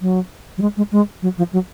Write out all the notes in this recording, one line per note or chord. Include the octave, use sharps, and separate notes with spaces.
F#3
F#3
G#3
G#3
G#3
F#3
F3
F#3